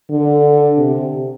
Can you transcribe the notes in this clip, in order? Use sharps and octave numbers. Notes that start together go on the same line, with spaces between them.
D3
C3